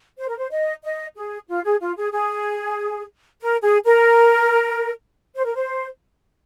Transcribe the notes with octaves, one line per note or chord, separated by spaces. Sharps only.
C5
A#4
C5
D#5
D#5
G#4
F4
G#4
F4
G#4
G#4
A#4
G#4
A#4
C5
A#4
C5